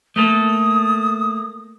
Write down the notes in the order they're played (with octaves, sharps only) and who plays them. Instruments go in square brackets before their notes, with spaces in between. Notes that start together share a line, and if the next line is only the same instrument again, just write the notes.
[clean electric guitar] A3 A#3 A4 [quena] D#6